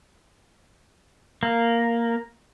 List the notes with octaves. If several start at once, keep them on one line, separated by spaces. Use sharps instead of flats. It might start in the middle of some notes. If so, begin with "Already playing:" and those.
A#3